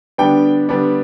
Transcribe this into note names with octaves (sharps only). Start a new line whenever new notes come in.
D3 G3 B3 D4 G5
D3 G3 B3 D4